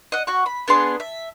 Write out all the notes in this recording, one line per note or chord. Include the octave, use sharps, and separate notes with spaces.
D#5 F#5
F#4 F#5 C#6
B5
B3 D4 G#4 C6
E5